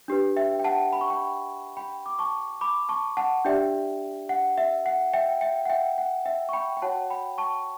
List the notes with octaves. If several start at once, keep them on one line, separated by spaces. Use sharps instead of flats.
D4 G4 B4
E5 G5
G5
F#5 A5
B5
C#6
G5 B5
G5 B5
D6
A5 C#6
B5 D6
A5 C#6
F#5 A5
D4 G4 D5 E5 G5
F#5
E5
F#5
E5 G5
E5 G5
F#5
E5 G5
F#5
E5 G5
C#6
G5 B5
G5
F#4 C#5 F#5 A5
G5 B5
A5 C#6